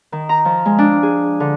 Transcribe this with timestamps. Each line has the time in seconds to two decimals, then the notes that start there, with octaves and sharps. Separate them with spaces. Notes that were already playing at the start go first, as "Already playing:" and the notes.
0.12 D#3
0.29 A#5
0.45 F3
0.66 G#3
0.78 D4
1.03 G#4
1.40 D3